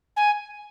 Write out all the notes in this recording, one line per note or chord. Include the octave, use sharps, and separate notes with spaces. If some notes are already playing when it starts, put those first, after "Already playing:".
G#5